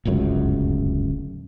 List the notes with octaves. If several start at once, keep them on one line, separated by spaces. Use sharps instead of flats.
D1 G1 C#2 F#2